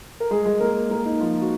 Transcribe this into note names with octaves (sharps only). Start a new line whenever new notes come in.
A#4
G#3 G#4
G#3 G#4
A#3 A#4
A#3 A#4
D#4
F3 F4
F#4